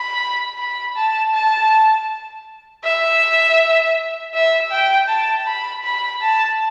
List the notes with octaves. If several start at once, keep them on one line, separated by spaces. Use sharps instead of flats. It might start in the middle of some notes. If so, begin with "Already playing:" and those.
Already playing: B5
B5
A5
A5
E5
E5
G5
A5
B5
B5
A5